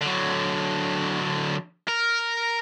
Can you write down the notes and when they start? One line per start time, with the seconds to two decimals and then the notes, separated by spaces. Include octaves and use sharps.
0.02 D3 F#3
1.88 A#4